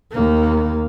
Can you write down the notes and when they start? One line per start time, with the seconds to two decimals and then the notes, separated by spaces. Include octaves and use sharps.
0.12 D#2 A#3